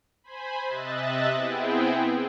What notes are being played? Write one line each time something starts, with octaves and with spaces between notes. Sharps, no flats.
C5 G#5 B5
C3 D#5 E5 F#6 A6
B3 C4 E4 G#4 G5